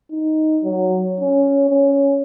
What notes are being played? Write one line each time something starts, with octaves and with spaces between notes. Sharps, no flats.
D#4
F#3
C#4
C#4